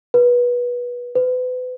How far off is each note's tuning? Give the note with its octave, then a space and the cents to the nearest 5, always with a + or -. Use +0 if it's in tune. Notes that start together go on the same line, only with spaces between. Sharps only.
B4 -20
B4 +35